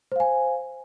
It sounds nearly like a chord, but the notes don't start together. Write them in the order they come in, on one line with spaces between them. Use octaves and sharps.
C5 F5 G#5